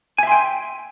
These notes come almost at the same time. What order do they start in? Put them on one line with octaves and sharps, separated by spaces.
G#5 E5 C6 G5